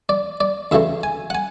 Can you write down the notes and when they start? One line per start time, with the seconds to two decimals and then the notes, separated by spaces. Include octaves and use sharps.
0.09 D5
0.40 D5
0.72 D2 C#3 E3 A3 E5
1.03 G#5
1.30 F#5
1.35 G#5